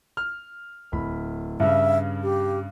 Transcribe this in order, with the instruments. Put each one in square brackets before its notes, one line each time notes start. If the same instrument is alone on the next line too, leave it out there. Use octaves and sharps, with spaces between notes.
[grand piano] F6
D1 B5
[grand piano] G2 C#3 [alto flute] E5
[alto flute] G4